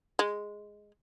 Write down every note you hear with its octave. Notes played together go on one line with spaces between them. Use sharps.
G#3